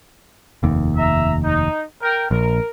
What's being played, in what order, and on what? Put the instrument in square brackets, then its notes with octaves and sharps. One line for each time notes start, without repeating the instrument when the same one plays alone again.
[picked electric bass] F1 D#2
[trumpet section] E5 A#5
D#4
A#4 G5
[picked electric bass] A#1 [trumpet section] A#4